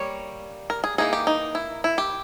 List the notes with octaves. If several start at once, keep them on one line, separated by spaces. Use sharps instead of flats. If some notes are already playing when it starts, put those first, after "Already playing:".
Already playing: G3 A#3 C#5
A#4
G#4
E3 A#3 D#4 G#4
G4
D#4
E4
E4
G4